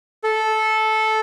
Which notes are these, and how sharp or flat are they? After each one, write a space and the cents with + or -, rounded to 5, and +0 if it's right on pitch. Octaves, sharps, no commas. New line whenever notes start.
A4 -10